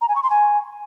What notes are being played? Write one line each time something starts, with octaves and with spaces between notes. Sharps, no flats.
A#5
G#5
C#6
C6
G#5